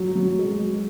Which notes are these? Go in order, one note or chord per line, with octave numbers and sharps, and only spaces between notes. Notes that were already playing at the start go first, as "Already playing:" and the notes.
Already playing: F#3
F#3
G#3